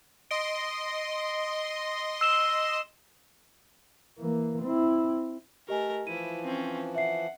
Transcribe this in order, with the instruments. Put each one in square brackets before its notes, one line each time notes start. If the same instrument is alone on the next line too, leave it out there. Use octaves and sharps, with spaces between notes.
[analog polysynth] D#5 C6 [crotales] D7
[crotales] E6 E7 G7
[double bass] E3 A#3
C4 E4
[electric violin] A3 A#4 [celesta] G4 D#5 G#5
[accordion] E3 F3 [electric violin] E4 [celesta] D#7
[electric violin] C4 C#4
[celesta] E5 C7 [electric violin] F#5